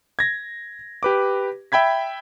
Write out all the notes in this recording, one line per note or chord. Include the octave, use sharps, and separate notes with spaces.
G#6 A#6
G4 B4 D6
E5 G5 B5 G#6 B6